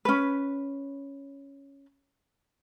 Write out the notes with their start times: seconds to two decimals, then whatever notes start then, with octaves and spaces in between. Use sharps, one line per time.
0.05 C#4 B4